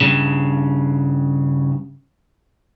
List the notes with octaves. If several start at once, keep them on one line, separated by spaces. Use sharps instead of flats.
G2 C#3